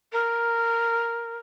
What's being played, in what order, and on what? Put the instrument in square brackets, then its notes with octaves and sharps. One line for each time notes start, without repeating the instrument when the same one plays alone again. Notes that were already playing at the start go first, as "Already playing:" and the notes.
[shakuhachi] A#4